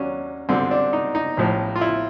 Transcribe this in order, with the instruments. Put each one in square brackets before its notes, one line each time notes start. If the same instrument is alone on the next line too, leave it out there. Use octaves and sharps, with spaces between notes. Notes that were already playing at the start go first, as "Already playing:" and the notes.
Already playing: [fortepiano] D#2 F#3 C#4 D4
G#1 G2 D3 C4
D4
D#4
D#4
A1 A2 F3
F4
E4